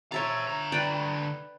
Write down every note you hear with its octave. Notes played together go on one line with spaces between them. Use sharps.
C5 C#5 E5 A5 A#5
D3 A#5
B4 D5 G5